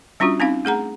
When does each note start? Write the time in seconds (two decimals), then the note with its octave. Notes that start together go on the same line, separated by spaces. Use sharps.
0.20 G3 C#4 D4 F4 F#4
0.40 C4 C#4 D#4 F5
0.65 A3 G#4 F#5 A#5